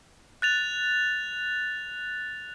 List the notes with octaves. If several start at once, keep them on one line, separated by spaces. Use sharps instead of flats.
F#6 A6 F7